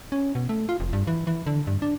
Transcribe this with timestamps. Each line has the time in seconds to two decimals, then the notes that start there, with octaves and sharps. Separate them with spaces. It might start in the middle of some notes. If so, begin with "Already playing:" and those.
0.12 C#4
0.35 B2
0.49 A3
0.69 F4
0.80 F1
0.93 G2
1.07 E3
1.27 E3
1.46 D3
1.67 G2
1.82 D4